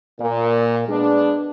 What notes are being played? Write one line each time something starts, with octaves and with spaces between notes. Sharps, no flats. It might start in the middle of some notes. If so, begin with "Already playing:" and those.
A#2
G#3 B3 D4